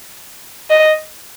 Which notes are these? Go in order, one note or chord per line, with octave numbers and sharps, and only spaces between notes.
D#5